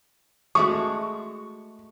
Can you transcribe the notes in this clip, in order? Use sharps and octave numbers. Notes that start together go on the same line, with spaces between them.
G#3 A3 F#4 C#6